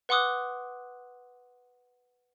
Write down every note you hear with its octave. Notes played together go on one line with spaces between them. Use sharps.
B4 F#5 C6 D6 D#6 F#6